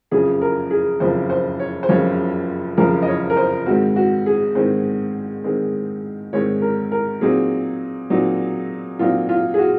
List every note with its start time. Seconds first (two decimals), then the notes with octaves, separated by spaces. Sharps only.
0.11 F#1 F2 C#3 F3 G#4
0.42 A#4
0.71 G#4
1.00 F#1 F2 C#3 F3 C5
1.30 C5
1.60 C#5
1.83 C5
1.89 F#1 F2 C#3 F3 C#5
2.77 F#1 F2 C#3 F3 A#4
3.03 D#5
3.07 C#5
3.30 A#4
3.37 C5
3.66 G#2 D#3 G#3 C4 F#4
3.96 F#4
4.26 G#4
4.55 G#2 D#3 G#3 C4 C5
5.44 G#2 D#3 G#3 C4
6.33 G#2 D#3 G#3 C4 C#5
6.62 A#4
6.92 A#4
7.21 A#2 F#3 C4 D#4 G#4
8.10 A#2 F#3 C4 D#4
8.99 A#2 F#3 C4 D#4 F4
9.29 F4
9.54 G#4
9.58 F#4